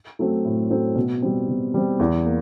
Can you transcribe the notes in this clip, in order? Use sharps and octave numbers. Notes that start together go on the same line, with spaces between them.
F#3 A3 C4
A2
F#3 A3 C4
B2
G3 C4
B2
G3 C4
E2
A#3